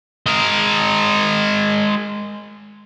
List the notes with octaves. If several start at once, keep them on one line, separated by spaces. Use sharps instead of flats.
G#3 A#4